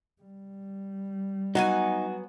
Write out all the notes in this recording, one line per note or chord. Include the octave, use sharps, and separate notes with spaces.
G3
F#3 B3 D#4 F#4 G#5